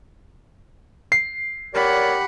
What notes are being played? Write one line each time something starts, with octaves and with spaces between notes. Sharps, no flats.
C7
G4 A#4 C#5 D5 F#5 B5